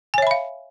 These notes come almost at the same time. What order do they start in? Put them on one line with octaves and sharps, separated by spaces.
G#5 C#5 E5 B5 F5